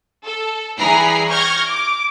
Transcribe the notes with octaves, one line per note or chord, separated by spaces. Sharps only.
A4
E3 G3 G#4 A#5 B5 C7
C#6 F6 G6 G#6 A#6
D6